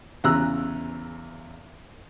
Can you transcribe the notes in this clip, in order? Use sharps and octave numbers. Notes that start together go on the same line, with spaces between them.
E2 C#3 A#5 E6 F#6